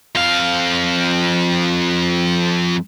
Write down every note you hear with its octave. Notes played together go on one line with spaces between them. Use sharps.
F2 F5